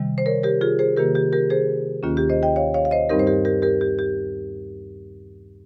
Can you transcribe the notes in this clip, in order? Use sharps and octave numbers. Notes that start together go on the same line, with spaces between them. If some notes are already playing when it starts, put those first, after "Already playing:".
Already playing: C3 D#3 G3
C5
A#4 C#5
G4 A#4
F4 G#4
G#4 C5
C3 D#3 A#3 G4 A#4
G4
G4 A#4
G#4 C5
D#2 D#3 A#3 C#4 F4
G4
C5 D#5
D#5 G5
C#5 F5
C#5 F5
F5
C5 D#5
G2 G3 C4 D#4 G4 A#4
C5
G4 A#4
G4 A#4
G4 A#4
G4
G4